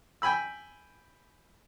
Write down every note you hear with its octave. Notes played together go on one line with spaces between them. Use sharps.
G5 G#5 B5 E6